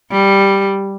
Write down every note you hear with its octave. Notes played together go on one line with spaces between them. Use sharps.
G3